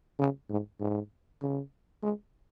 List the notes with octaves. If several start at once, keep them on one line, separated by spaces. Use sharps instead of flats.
C#3
G#2
G#2
C#3
G#3